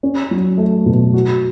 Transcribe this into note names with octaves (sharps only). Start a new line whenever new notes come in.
C#4
F#3
A3
B2
F#4